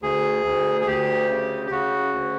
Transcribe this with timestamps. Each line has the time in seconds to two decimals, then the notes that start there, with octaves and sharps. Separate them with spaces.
0.02 D2 G#4
0.45 D2
0.81 G#4
0.87 D2 G4
1.29 C#3
1.67 G4
1.71 C#3 F#4
2.13 D2